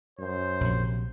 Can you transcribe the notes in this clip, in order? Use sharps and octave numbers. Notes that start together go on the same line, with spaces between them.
F#2 C5
A#1 C3